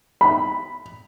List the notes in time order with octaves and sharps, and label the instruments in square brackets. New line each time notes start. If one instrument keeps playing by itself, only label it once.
[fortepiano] B5